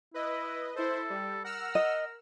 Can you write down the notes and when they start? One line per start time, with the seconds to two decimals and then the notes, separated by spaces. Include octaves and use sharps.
0.14 E4 B4 D#5
0.76 E4 A4 C5
1.10 G3
1.44 A#4 F#5 E6 F6
1.75 D#5